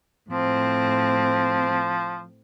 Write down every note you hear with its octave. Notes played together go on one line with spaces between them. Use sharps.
A2 F3 C4